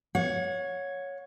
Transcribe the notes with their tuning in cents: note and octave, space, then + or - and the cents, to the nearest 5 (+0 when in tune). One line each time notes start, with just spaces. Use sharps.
C#5 +0 F#5 -40